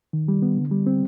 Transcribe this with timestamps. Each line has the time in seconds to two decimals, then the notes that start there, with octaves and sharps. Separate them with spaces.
0.13 D#3
0.28 G3
0.42 B3
0.57 D3
0.71 G3
0.87 C4